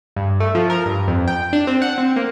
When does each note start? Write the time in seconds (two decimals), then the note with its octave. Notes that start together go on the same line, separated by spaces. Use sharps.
0.16 G2
0.40 A3
0.55 F3
0.70 A#4
0.86 G2
1.08 F2
1.28 G5
1.53 D4
1.67 C4
1.82 F#5
1.98 C4
2.16 A#3